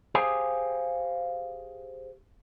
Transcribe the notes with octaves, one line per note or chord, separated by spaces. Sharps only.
G4 G#4 C5 F5 G#5